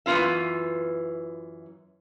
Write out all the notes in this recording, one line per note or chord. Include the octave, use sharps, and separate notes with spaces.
F#2 E3 B3 F4 E5